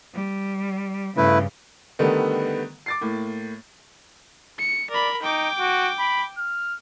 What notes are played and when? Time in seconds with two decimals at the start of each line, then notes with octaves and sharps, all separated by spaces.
0.14 G3
1.17 G2 C#3 A3 E4 B4
1.99 D3 D#3 G3 A3 B3
2.86 D6 A6 C7
3.01 A2 A#3
4.58 C#7
4.90 A#4 D5 B5
5.22 D#4 G5 D6
5.60 F#4
5.99 B5
6.38 F6